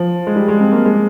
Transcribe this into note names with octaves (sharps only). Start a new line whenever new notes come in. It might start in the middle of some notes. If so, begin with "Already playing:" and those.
Already playing: F3
G#3
G3
G#3
C4
A#3
G#3